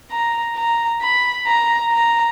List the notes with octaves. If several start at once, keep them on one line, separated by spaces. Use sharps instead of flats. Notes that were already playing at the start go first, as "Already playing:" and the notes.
A#5
A#5
B5
A#5
A#5